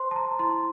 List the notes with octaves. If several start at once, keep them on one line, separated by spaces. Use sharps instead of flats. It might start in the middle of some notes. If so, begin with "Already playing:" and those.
Already playing: C5 C6
A5
A#5
E4 C6